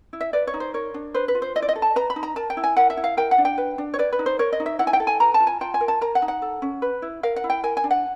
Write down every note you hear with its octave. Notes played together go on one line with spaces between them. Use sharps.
E4
E5
B4 D5
C#5
D#4
C5
A#4 C#5
D4
B4 C5
B4
F4
C5
E4 D#5
D5
D#5
A4
A5
B4 A#5
B5
D#4
A#5
A#4 A5
G5
E4
G#5
A#4 F#5
E5
E4
F5
A#4 G5
F#5
D4
G5
B4
D4
C#5
B4 D5
B4
D#4
C5
A#4 C#5
D#5
D#4
E5
E4 F#5
G#5
G5
A4
G#5
B4 A#5
A5
F4
G#5
F4 G5
G#5
A#4
A5
A#4 A#5
F#5
D#4
F#5
A4
C#4
B4
E4
A#4 F5
F#5
E4
G5
A#4 G#5
G#5
D4
F#5